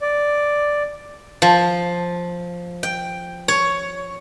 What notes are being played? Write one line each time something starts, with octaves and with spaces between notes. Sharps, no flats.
D5
F3
G5
C#5